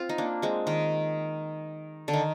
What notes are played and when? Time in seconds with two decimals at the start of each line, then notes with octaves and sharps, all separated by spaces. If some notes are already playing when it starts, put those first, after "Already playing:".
Already playing: C4 F4
0.09 D#4
0.18 A#3 D4
0.42 G#3 C4
0.67 D#3
2.08 D3
2.13 D#3